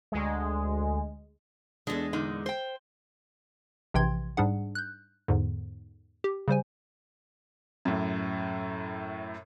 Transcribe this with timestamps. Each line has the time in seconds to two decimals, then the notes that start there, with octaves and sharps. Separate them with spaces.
0.12 D2 G#3
1.87 E2 G#3 D4 A4
2.13 A#2 D3 D#4
2.46 C5 G5
3.94 A#1 C3 E3 G5 C6 G#6
4.37 G#2 G3 D4 G#4 F#5
4.75 F#6 G6
5.28 E2 G#2 D3
6.24 G4
6.48 C#3 G3 C5 G#5
7.85 F#2 A2